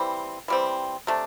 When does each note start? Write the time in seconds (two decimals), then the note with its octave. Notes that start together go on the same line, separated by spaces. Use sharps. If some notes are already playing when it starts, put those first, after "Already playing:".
Already playing: E3 G3 C4
0.48 E3 G3 C4
1.07 C3 A3 D4